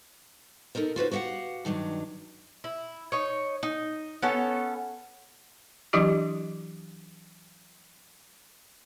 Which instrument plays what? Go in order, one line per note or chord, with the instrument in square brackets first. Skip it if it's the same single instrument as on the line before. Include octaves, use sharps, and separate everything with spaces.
[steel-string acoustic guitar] B3 D#4 A4 A#4 C5
F4 F#4 B4 C5
F#4 G4 D#5 F5 F#5
G2 D#3 F#3 D4
[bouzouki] E4
D#4 C#5
D#4
B3 C#4 A4
[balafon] E3 F#3 D4 E4 G4 D6